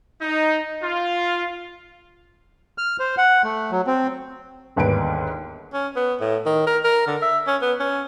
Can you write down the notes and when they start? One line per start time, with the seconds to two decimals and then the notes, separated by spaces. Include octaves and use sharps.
0.22 D#4
0.83 F4
2.78 F6
2.99 C5
3.18 F#5
3.43 A3
3.71 F#3
3.87 C4
4.76 G1 D#2 G#2 D4 B4 D7
5.73 C#4
5.96 B3
6.20 A2
6.46 D#3
6.67 A#4
6.84 A#4
7.07 D3
7.22 E5
7.47 C#4
7.61 B3
7.80 C#4